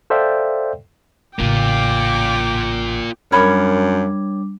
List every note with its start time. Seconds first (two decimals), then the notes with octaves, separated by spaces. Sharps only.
0.10 A4 C5 D5 E5 F5 G5
1.39 A1 C#3 A#3 F4 G5 D6
3.32 F#2 G3 D4 A#4 C#5 B5 D6